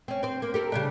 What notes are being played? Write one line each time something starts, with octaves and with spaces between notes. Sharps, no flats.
C4 C#4
C4 C5
A#3
G4 A4 A#4
C#3 G3 D4